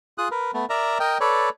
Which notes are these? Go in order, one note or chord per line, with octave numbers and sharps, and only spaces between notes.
F4 G#4 D#6 F#6
A#4 B4
A3 B3
A#4 D5 E5 A#5
A#4 D#5 G5
A4 B4 C#5 D5